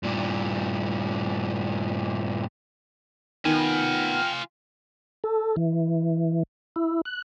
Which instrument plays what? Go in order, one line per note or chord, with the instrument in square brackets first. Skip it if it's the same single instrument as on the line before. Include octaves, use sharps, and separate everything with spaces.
[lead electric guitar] G2 A#2
[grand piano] D#3 [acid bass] B3 [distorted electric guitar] F4 G#5 [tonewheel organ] G5 F6
[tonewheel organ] A4
E3
E4
F#6